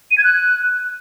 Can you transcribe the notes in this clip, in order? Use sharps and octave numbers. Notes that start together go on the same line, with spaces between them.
D#7
G#6
F#6